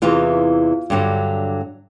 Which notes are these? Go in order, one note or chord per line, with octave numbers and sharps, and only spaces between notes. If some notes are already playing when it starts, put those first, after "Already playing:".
E2 C3 E3 F4
G2 D3 F#3